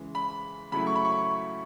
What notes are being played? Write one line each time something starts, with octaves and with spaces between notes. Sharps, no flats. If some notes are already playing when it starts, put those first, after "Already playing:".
Already playing: C#3 E3 G#3
B5
C#3 F#3 A3 E4 B5
C#6
B5
C#6